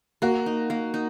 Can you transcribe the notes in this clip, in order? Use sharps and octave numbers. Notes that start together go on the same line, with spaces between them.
A#3 F#4
D#4
A#3
D#4